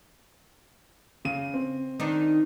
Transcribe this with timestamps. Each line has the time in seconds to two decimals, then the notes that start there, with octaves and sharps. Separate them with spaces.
1.25 C#3 D#7
1.54 C4
2.00 D#3 D4 D#4